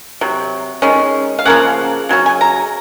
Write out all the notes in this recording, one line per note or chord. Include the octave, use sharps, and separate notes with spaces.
C3 F#3
D#3 G#3 C#4
F5
C#3 F3 A#3 C#4 F#5
C#3 F#3 C#4
G#5
A#5